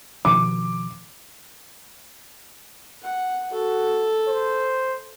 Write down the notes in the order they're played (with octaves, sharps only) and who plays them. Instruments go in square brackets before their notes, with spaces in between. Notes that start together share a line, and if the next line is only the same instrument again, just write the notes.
[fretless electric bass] B2 D#3 F3 [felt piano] D6
[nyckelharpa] F#5
[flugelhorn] F#4 [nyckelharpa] A4
[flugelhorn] C5